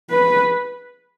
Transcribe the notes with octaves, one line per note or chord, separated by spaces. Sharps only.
B4